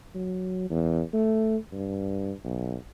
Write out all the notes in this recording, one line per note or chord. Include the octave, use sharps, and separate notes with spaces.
F#3
E2
A3
G2
B1